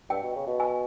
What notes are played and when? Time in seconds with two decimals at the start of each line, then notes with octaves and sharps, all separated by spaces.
0.10 G2 G5
0.23 B2
0.36 C#3
0.47 B2
0.60 G#5